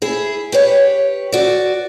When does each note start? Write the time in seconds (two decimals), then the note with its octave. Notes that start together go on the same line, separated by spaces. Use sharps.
0.02 E4 G#4
0.52 G4 B4 C#5
1.32 F#4 D5